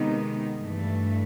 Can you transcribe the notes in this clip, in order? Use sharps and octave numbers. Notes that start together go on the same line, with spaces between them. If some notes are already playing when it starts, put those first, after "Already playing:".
Already playing: C3 D#3 G#3 B3 D#4
G2 E3 A3